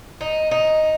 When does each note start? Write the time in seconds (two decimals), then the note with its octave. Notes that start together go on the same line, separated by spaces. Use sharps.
0.21 D#4
0.51 D#4